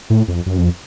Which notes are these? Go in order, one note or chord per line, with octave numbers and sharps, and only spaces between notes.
A2
F2
F#2
F2